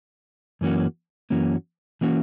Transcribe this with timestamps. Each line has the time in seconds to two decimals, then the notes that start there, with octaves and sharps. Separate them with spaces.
0.61 F#2 E3 A#3 C#4 F#4
1.30 F#2 E3 A#3 C#4 F#4
2.01 E3 A#3 C#4 F#4